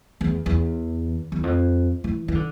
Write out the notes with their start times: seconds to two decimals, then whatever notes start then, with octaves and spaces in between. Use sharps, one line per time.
0.21 E2
0.46 E2
1.32 E2
1.43 F2
2.04 E3
2.28 E3
2.35 D3